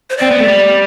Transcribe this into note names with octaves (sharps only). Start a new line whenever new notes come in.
C5
C4 D5
B3
A3
G3